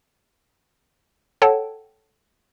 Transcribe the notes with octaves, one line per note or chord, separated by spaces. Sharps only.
A4 C#5 F#5 G5 A5